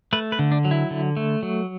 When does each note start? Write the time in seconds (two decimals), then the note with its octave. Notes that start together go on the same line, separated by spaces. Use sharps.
0.13 A3 B4
0.32 B4
0.39 D3
0.52 D4
0.65 F#3
0.71 E4
0.91 D3
1.17 A3
1.43 F#3